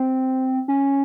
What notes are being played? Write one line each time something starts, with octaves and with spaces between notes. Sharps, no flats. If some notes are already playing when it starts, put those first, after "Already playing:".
Already playing: C4
C#4